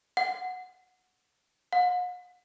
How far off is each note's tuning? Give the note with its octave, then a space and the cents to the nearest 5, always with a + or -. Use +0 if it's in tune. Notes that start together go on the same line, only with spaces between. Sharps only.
F#5 -5
F#5 -45